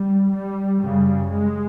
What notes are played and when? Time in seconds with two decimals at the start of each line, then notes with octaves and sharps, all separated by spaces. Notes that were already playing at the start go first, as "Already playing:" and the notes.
Already playing: G3
0.31 G3
0.80 F#2 C#3 G3
1.30 G#3